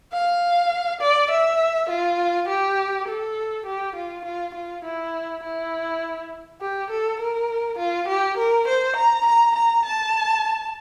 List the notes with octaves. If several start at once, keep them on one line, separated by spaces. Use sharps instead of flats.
F5
D5
E5
F4
G4
A4
G4
F4
F4
F4
E4
E4
G4
A4
A#4
F4
G4
A#4
C5
A#5
A#5
A#5
A5